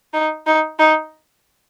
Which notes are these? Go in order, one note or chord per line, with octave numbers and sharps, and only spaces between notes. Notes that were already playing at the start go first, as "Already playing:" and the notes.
D#4
D#4
D#4